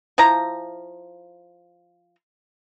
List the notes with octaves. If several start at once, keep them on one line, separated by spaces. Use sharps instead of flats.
F3 E4 F5 A#5